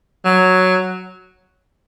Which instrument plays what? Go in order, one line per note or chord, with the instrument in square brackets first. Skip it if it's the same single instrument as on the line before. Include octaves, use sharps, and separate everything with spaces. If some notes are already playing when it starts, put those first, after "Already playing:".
[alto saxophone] F#3